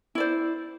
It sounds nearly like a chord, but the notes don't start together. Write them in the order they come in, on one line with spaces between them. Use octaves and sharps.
E4 D5 C5